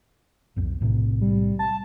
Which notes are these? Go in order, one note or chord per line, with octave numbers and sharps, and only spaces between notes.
B1 F2
B1 A2 C3
G3
A5